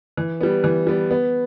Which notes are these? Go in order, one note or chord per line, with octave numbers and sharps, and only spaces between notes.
E3
G3 B3
E3
G3 B3
B3